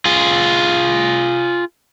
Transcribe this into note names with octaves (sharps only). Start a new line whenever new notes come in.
F4 G#4